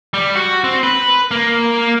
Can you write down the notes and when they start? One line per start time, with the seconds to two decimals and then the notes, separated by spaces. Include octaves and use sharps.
0.14 G3
0.36 F#4
0.64 C4
0.83 B4
1.31 A#3